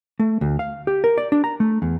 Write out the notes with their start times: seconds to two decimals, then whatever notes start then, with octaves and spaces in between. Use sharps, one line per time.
0.19 A3
0.41 D2
0.59 F5
0.87 G4
1.04 A#4
1.18 D5
1.32 D4
1.44 A#5
1.60 A3
1.82 E2